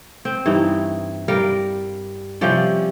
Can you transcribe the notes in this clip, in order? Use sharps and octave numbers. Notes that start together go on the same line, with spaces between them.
C4
G2 E3 D#4
G3 A#4 F5
C3 F3 G3 C#4